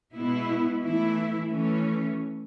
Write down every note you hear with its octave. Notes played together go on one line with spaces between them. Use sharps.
B2 G#3 B3 E4
E3 A3 E4
E3 A3 C#4